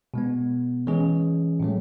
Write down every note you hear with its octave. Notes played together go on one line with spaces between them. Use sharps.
B2 G#3 B3
E3 G#3 C#4 G#4
A2 F#3 A3